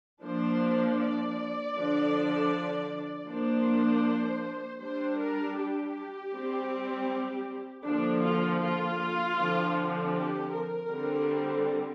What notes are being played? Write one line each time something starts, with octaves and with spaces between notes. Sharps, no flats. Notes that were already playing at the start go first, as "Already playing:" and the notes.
F3 A#3 D4 C5
D5
D3 F3 D4
F3 A#3 D4 C5
G3 D4 C5
A#4
G4
G3 C4
D3 F3 A#3 D4
F4
F4
D3 F3 C4
G4
A#4
D3 G3 C4